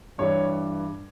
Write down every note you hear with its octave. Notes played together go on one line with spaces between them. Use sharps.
G2 E3 G3 C#5